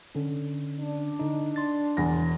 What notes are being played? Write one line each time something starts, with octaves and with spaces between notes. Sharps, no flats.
D3 C#4
D4
D3 D#4
C6 A6
E1 E2 A#6